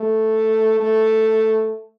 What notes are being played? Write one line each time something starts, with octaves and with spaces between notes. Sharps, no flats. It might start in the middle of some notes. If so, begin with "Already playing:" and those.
Already playing: A3
A3